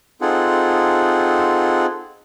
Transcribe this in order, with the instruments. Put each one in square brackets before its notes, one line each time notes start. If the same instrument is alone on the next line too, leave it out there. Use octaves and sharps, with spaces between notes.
[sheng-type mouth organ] C4 D#4 F4 G#4 A4 F#5